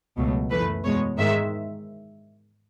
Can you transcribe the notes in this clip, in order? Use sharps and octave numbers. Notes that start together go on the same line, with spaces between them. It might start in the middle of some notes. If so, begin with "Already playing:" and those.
C#2 B2 F#3 A3
F#2 E3 A3 B4
E2 B2 G#3 C#5
G#2 D#3 G#3 E5